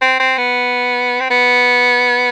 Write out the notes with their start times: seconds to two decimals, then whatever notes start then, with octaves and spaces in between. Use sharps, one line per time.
0.01 C4
0.20 C4
0.38 B3
1.20 C4
1.30 B3